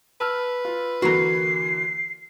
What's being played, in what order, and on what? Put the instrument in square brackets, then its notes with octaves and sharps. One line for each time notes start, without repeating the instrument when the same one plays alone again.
[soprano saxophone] B4 [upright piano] A5 E6 F6
[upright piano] F4
[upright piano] D3 E3 A#3 [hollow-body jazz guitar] F#4 A#5 [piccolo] C7